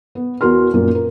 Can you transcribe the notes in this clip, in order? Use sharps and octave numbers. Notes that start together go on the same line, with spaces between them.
B3
E2 F#4 A#4 C6 F6
F#2 A#2 A#3 F4
A#4